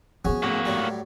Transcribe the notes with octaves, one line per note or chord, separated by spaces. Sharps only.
F3 B3 C#4 F#4 G#4
A2 C#3 A#3 F#4
A2 F#3 G3